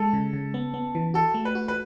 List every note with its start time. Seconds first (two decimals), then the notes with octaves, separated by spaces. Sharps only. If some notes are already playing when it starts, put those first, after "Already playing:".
Already playing: G#3 A4
0.13 C#3
0.33 C#3
0.54 B3
0.74 B3
0.95 E3
1.14 F#4 A4
1.34 A3
1.45 B4
1.55 F#4
1.68 B4